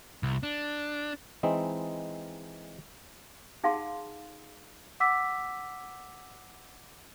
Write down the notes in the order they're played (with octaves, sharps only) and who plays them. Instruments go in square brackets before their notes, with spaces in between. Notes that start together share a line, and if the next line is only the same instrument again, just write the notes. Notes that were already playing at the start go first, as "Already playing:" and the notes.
[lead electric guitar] C2
D4
[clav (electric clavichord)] E3 G#3 C4 D#4
[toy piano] D#4 G#4 F5 F#5 A5 C6
[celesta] F#5 D6 E6 B6